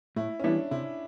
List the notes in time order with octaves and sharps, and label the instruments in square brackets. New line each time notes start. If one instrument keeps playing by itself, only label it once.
[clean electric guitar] A2 [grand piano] E4
[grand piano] C#4
[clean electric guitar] E3 G3 B3 E4 [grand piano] D4
[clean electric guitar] C3 [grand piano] E4